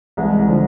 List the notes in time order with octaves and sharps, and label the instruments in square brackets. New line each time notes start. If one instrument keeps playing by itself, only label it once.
[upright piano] C2 [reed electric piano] E3 G#3
[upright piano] C2
[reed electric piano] D3 F3